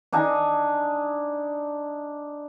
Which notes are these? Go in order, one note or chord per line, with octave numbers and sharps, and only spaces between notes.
D4 D#4 G#5